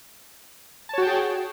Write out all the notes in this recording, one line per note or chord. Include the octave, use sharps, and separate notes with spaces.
F#4 G#4 C#5 G5 A5